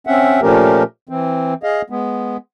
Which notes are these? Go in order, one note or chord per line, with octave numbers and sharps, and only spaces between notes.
C4 C#4 E5 F#5
A#2 F3 A3 C#4 G4 A#4
E3 C4
G#4 D#5 F5
G#3 B3